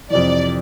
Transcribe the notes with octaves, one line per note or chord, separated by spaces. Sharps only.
F2 C3 E3 D5